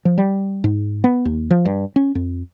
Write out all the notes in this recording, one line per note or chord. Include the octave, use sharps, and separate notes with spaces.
F3
G3
G#2
B3
D#2
F3
G2
C#4
F2